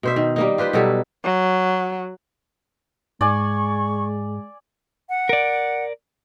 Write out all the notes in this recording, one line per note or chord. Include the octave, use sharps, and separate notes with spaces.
B2 C5 E5
D#3
G3 A#3 D#4
F4 G4 B4 C5
B2 F#3 G3 A4
F#3
G#2 G#3 D5 G#5 C#6
F#5
A#4 D5